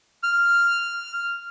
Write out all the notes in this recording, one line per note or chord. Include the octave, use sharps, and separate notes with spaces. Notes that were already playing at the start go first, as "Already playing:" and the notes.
F6